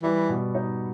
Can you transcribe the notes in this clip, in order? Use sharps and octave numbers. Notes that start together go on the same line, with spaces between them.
E3 G3
B2
D#4